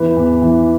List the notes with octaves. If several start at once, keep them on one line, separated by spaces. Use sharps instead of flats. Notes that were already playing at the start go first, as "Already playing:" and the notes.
Already playing: E2 E3 B4
E2
E3